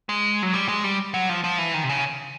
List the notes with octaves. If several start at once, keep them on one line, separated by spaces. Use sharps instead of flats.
G#3
F#3
G3
G#3
G3
F#3
F3
F3
E3
D#3
C3
C#3